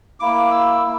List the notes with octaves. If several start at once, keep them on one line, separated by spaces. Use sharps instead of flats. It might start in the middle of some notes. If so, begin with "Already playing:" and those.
A#3 E4 D6
E6
A#3 E4